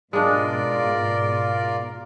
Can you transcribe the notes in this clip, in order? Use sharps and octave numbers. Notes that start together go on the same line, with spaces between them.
G#2 B2 G#3 D4 F4 A#4 D5